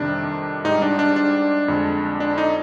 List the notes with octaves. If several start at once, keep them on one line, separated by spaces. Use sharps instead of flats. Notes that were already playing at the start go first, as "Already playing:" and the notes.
Already playing: F2 C3 D#3 G3 D4
G#2 G3 D#4
D4
D4
D4
F2 D3 G#3
D4
D#4